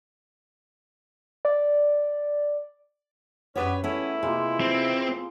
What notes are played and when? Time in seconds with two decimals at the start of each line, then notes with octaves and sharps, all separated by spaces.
1.45 D5
3.55 F#2 B3 C#4 D4 G4 B4 C#5
3.84 E2 A3 B3 C#4 E4 E6
4.23 C3 G#3 A#3 F4
4.60 C4